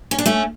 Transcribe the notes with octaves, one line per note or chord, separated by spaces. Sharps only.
C#4
D4
A3 C#4